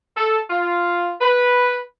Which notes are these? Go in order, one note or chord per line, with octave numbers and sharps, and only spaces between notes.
A4
F4
B4